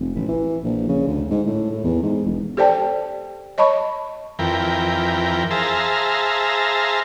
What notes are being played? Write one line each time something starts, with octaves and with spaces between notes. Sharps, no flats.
F1
A1
E3
A#1
C#3
D2
G#2
A2
A2
E2
G#2
E1
G4 A4 C5 D5 G5 A5
C#5 D#5 A5 B5 C#6
F2 E3 A#4 G5
G#4 C5 E5 F5 A5 A#5